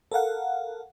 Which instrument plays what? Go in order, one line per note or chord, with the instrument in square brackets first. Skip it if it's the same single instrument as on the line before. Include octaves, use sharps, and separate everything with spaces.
[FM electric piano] A4 A#4 F5 F#5